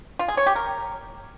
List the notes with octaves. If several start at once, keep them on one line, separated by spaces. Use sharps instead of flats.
F4
G#4
C#5
G4
A#4